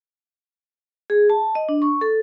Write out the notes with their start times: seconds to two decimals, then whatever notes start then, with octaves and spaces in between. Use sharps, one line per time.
1.10 G#4
1.30 A5
1.55 D#5
1.69 D4
1.82 C#6
2.01 A4